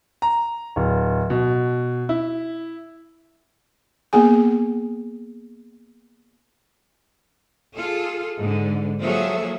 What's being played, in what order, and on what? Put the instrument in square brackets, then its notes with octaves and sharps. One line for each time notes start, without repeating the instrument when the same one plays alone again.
[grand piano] A#5
D1
B2
E4
[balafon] A#3 B3 G#4 G#5
[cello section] F4 G#4 A4
G#2 D3
F3 F#3 A#3 G#4 A4 E5